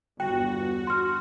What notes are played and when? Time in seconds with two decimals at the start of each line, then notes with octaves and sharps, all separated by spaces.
0.20 G1 E2 G2 F#4 G5
0.87 C6 F6